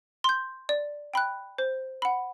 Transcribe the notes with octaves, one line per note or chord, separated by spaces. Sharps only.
C6 G6
D5
G5 B5 F#6
C5
F#5 B5